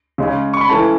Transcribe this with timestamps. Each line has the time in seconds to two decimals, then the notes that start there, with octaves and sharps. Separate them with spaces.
0.18 C#3 G#3 C#4
0.54 C#6
0.61 B5
0.69 E3 A3 C#4 A5